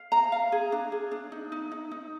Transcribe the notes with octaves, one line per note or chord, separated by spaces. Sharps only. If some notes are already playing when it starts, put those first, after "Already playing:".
Already playing: F5
A#5
F5
G#4
D4
G#4
D4
D#4
D#4
D#4
D#4